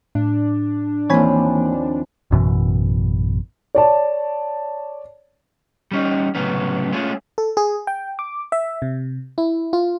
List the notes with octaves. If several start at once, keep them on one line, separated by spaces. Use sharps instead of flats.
A2 D4
D#2 E3 F3 A#3 C4 C#5 G#5 B5
A1 F#2 B2 E3
C#5 D5 A5
G3 C#4 D#4
C2 A2 C#3 F#3 B3 C#4
G#3 A3 C#4 F4 G#4
A4
G#4
G5
D6
E5
C3
E4
F4